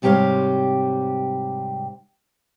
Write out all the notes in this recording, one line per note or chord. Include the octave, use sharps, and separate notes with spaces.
G#2 C3 G3 G4 C#5 F5